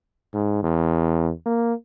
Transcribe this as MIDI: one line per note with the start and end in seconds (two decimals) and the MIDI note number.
0.34 0.61 44
0.63 1.31 40
1.46 1.73 58